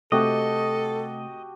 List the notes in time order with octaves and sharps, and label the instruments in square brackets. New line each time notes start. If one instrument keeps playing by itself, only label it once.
[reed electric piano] C3 A3 C4 [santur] F#4 G4 A5 [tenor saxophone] A4 [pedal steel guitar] D#5